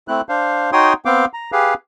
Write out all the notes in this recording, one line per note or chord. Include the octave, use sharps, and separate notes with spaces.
A3 C4 E4 F#6
D4 C5 F5
D#4 F#4 C#5 G5 C6 D#6
B3 C4 F5 G5 D6
A#5
G4 G#4 B4 F5